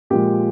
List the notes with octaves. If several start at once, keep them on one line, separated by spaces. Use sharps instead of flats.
A#2 F3 G#3 G4